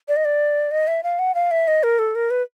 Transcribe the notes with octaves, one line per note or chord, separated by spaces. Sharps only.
D5
D#5
D5
D#5
E5
F5
F#5
F5
E5
D#5
A#4
A4
A#4
B4